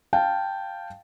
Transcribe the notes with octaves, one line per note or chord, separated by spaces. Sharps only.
F5 G5 A5